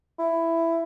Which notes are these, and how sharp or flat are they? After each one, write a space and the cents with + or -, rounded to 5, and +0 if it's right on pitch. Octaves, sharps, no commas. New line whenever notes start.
E4 +10